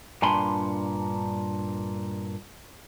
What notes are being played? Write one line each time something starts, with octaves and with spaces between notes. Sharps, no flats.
G2 A#2 D4 G#5 B5 C6